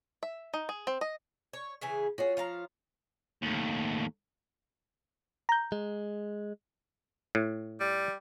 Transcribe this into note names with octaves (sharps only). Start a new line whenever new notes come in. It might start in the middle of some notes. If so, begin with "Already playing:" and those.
E5
D#4
G#4
C4
D#5
C#5
C#3 E3 G#4
F4 F#4 G#4 C#5
F3 F5 A#5
D#2 A2
A#5 G6
G#3
A2
G3